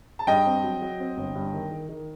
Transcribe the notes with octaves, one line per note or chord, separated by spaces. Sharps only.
A5
G2 D#5 G5
C4
F#3
F#3
C4
G1
G2
D#3
D#3
D#3